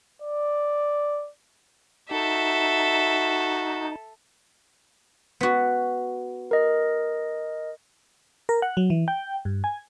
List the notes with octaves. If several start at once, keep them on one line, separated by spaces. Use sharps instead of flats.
D5
D#4 F#4 A4 E5
B3 F#4
A#4 D#5
A#4
F#5
F#3
E3
G5
G2
G#5